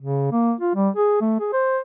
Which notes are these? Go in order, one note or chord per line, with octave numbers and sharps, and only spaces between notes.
C#3
A#3
F4
G3
G#4
A3
G#4
C5